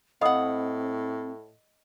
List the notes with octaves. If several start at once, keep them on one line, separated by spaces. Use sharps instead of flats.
A2 C4 D#5 F5 F#5 B5 D#6